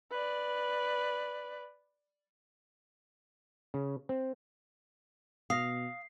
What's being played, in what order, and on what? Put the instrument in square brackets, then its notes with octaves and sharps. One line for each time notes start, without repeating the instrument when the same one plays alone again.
[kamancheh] B4 D5
[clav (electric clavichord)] C#3
C4
[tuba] B2 [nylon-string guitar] F5 [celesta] D#6 A#6 [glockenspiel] C7